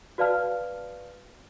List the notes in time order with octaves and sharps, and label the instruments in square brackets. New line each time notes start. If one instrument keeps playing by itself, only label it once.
[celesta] F#4 B4 D5 F5 A5 F6